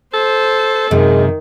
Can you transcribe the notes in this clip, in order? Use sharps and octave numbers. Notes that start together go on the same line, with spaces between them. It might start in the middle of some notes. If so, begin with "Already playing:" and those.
A4 C5
F#2 C3 D#3 G#3